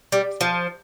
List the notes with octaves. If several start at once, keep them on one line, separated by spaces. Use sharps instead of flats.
G3
F3